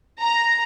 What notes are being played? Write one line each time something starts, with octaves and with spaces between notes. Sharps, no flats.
A#5